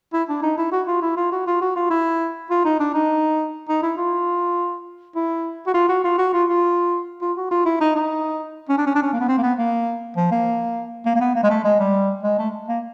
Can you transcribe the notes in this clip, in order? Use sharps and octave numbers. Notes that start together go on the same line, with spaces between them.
E4
D4
D#4
E4
F#4
F4
E4
F4
F#4
F4
F#4
F4
E4
F4
D#4
D4
D#4
D#4
E4
F4
E4
F#4
F4
F#4
F4
F#4
F4
F4
F4
F#4
F4
E4
D#4
D#4
C#4
D4
C#4
D4
C#4
A#3
B3
C4
A#3
B3
A#3
F3
A#3
A#3
A#3
B3
A#3
G#3
A3
G#3
G3
G#3
A3
A#3